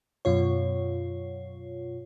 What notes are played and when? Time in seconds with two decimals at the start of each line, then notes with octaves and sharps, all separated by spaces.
0.25 F#2 B2 F4 C#5